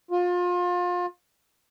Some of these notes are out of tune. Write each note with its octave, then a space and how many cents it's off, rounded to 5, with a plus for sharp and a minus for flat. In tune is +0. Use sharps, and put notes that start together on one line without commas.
F4 +30